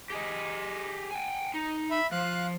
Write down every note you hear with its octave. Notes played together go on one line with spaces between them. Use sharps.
G4 G#4 D#5
G5 G#5
D#4
E5 B5
F3 F5 F#6